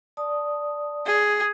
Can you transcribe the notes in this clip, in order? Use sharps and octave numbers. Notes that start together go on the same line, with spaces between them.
D5 A5 D#6
G#4